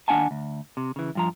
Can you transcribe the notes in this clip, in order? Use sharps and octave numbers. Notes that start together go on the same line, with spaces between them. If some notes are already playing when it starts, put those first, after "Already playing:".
D#2 D4 F#5 G#5 A5
D2
C3
C#3 E3
G2 F3 A#5